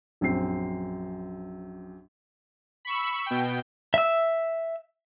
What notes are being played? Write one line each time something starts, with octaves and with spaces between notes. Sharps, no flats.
A#1 F#2 C4 C7
B5 C#6 E6
B2 G5
E5 E6